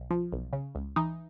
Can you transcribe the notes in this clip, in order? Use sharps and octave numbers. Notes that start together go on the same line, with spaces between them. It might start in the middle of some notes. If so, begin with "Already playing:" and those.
Already playing: B1
F3
B1
C#3
C#2
E3 D#4